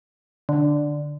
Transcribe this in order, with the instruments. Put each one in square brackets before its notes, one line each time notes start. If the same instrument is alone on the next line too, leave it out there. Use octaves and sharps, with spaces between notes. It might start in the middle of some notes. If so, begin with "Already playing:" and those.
[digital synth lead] D3